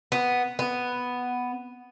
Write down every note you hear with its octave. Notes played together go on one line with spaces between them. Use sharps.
B3
B3